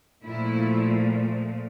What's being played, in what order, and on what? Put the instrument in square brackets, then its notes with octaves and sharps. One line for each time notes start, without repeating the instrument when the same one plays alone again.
[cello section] A#2 F3 A3 E4